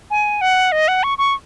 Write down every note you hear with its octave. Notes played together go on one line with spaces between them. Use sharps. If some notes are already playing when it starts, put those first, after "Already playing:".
G#5
F#5
D#5
F#5
C#6
C#6